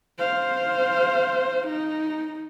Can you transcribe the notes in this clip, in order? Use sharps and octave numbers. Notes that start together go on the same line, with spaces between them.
C5 F5
D#4